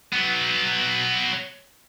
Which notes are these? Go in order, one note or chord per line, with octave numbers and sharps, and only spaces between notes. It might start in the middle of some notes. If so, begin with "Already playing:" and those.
F#3 B3